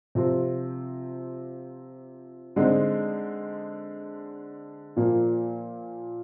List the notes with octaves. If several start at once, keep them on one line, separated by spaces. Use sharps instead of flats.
C3 F3 C4
D3 G#3 C4 D#4
A#2 F3 A#3